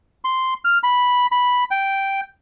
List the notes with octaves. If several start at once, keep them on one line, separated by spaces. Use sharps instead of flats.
C6
F6
B5
B5
G5